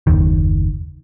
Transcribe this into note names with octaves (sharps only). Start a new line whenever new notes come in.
F#1 D#2 D#3